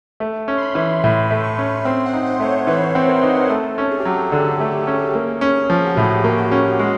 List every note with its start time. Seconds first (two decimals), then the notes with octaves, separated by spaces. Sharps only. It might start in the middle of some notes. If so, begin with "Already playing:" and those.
0.20 A3
0.48 C#4
0.57 C6
0.61 B5
0.75 E3
1.03 A2 C6
1.31 A3
1.44 C#6
1.58 C#4
1.85 C4 C6
2.06 F#5
2.13 D#4
2.26 C5
2.40 A3 C#5
2.48 C5
2.67 E3 B4
2.95 C4
3.09 A#4
3.23 D#4
3.50 A3 A4
3.78 C#4
3.91 G#4
4.00 G4
4.05 F#3 G#4
4.32 D3
4.60 A3
4.87 C#4
5.15 A#3
5.41 C#4
5.70 F3
5.86 F#4
5.96 A2 G4
6.24 A#3
6.38 F#4
6.52 C#4
6.79 G#3 F#4